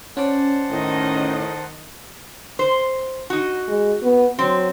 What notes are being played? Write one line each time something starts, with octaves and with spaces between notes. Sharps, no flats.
C#4 C5 D5 F#5 A5
A2 D#3 D#5
C5
D#4 F#4
G#3
B3
F#3 C4